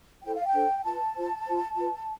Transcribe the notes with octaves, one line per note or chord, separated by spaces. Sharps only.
E4 A4 C5 G5
F5
G5
D4 A4 C5
F4 B4 A5
F4 C5
F4 C5
F4 B4